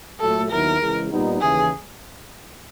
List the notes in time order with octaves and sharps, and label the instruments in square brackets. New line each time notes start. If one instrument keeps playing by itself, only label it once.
[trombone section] A#2 F#3 A3 [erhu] A4
[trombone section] D#2 D#3 F#3 B3 E4 [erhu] A#4
[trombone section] C#3 E3 G#3
A#2 G3 B3 D#4
[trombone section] D#2 C#3 E3 [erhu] G#4